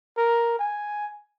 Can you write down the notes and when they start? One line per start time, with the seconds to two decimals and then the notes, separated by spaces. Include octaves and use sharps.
0.17 A#4
0.59 G#5